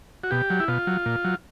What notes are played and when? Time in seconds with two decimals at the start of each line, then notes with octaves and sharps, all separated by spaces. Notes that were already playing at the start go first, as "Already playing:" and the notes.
0.24 F#4
0.31 B2 G4
0.50 F#3
0.60 E4
0.68 B2 F4
0.87 F#3
1.06 A#2
1.25 F#3